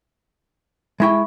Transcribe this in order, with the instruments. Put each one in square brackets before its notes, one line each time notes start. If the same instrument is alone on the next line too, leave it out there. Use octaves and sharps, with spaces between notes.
[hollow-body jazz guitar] G#3 E4 G5 [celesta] E5 B5 C#6